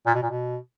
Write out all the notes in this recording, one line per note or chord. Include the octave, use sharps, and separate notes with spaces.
A#2
B2
A#2
B2